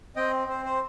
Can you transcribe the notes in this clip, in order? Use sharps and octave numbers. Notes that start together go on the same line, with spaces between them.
C4 D#5 G5
C4 C5
C5